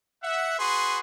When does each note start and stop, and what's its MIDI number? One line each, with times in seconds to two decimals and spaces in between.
0.22 0.56 76
0.22 0.56 78
0.59 0.99 66
0.59 0.99 68
0.59 0.99 71
0.59 0.99 84